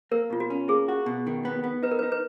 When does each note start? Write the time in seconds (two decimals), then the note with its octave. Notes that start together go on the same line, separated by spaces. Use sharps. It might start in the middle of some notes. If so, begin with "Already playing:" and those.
0.11 A#3 A#4
0.30 B2 F4
0.40 F#4
0.50 C#4
0.68 A#3 G#4
0.88 F#4
1.06 B2
1.27 D#3
1.45 B3
1.64 B3
1.83 D#4 B4
1.91 A#4
1.99 D#4 B4
2.12 B4